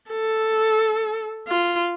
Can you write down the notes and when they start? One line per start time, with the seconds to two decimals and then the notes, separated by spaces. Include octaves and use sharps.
0.11 A4
1.48 F4